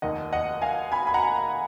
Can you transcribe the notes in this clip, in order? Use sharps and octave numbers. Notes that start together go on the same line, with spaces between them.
F1 D#2 D#3 D#5 F#5
D#5 F#5
F5 G#5
G#5 B5
B5
F#5 A#5